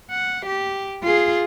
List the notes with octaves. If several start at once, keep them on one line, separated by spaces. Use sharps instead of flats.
F#5
G4
F4 G#4